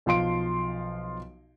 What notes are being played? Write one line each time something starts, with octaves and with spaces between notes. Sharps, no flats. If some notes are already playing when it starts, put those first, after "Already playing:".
B1 F3 F5 C6 D7